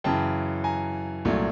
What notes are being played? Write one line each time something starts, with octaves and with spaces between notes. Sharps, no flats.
F#2 C#3 E3 G5 A5
G#5 A#5
C2 A#2 F#3 A3